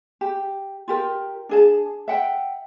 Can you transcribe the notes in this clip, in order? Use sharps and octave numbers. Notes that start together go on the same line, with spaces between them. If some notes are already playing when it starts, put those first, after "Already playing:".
G4
F4 G4 A#4
D4 G#4 A5
E5 F#5 G5